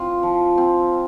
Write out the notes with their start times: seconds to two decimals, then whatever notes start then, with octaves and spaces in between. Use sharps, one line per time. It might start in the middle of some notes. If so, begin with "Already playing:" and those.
Already playing: C4 F4
0.23 F3
0.58 C4 F4